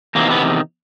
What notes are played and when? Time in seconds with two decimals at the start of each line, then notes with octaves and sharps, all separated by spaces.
0.15 E2 C3 D#3 A#3
0.31 B3